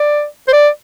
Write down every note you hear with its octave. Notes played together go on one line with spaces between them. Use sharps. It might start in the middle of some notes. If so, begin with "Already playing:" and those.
Already playing: D5
C5
D5